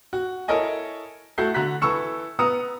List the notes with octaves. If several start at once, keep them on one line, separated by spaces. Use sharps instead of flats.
F#4
E4 A4 A#4 C#5 D#5 G#5
A3 E4 F#4 A4 G6 C7
D3 F#4 A#5 F#6 B6
E3 A4 B5 C#6 E6 C#7
B3 A#5 D#6 E6 C#7